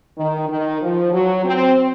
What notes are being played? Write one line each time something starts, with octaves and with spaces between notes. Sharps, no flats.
D#3
D#3
F3
F#3
C4